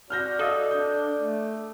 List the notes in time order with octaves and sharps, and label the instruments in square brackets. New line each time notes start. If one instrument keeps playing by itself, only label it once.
[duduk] F#4 [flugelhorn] D5 [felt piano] F6 G6 A#6
[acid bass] A4 [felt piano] D#5 F5 D#6
[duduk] D4 [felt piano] G6
[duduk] A3